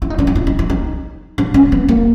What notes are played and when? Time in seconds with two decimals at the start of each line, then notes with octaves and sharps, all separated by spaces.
0.02 E4
0.10 D#4
0.18 D4
0.27 D#4
0.35 E4
0.47 D#4
0.59 E4
0.70 D#4
1.38 D4
1.54 C#4
1.72 B3
1.88 A#3